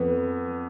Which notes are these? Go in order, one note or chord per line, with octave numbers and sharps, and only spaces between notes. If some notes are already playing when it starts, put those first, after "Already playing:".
Already playing: F2 B3